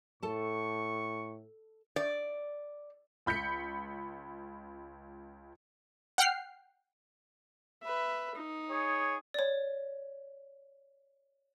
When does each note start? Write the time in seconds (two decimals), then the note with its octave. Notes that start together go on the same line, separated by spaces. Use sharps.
0.23 A2 A4 A5 C#6
1.96 D5
3.26 C#2 B5 G6 B6 C#7
6.18 F#5 G5 F6 C7
7.83 B4 E5
8.35 D#4
8.69 G#4 C#5
9.34 C#5 D5